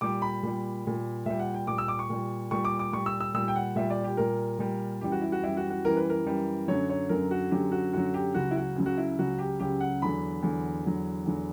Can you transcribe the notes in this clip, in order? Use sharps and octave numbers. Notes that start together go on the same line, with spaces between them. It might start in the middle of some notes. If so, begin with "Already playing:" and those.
A#2 G3 D6
B5
A#2 G3
A#2 G3
A#2 G3 E5
F#5
G5
A#2 G3 D6
E6
D6
C#6
A#2 G3
A#2 G3 C#6
D6
D6
A#2 G3 C#6
E6
E6
A#2 G3 E6
G5
F#5
A#2 G3 E5
D5
G4
A#2 G3 A#4
A#2 G3
F#2 E3 G3 G4
F#4
E4
F#4
F#2 E3 G3 E4
F#4
F#4
F#2 E3 G3 A#4
B4
A#4
F#2 E3 G3
F#2 D3 F#3 C#5
C#5
F#2 D3 F#3 A#4
F#4
F#2 D3 F#3 G4
F#4
F#2 D3 F#3 F#4
G4
C#2 C#3 F#3 F#4
E4
F#4
C#2 C#3 F#3
F#4
E4
C#2 C#3 F#3 F#4
G4
C#2 C#3 F#3 G4
F#5
E2 D3 F#3 B5
E2 D3 F#3
E2 D3 F#3
E2 D3 F#3